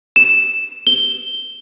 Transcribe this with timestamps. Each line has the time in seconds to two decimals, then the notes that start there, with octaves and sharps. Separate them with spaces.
0.16 E7
0.87 G7